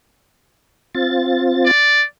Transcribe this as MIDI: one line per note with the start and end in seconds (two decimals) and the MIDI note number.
0.95 1.71 60
0.95 1.71 65
0.95 1.71 93
1.66 2.04 74